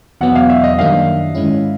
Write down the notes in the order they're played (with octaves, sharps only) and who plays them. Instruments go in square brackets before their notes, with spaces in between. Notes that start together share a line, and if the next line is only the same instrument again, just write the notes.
[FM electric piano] E2 B2 F#3 B3 [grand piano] F#5
[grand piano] F5
E5
D#5
[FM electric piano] F#2 D#3 G3 A#3 D4 [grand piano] F5
[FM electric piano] G#2 D#3 G#3 C#4 E4